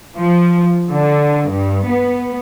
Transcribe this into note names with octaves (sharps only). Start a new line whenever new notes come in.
F3
D3
G2
B3